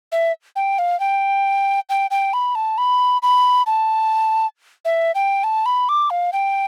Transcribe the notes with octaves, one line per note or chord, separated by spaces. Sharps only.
E5
G5
F5
G5
G5
G5
B5
A5
B5
B5
A5
E5
G5
A5
B5
D6
F5
G5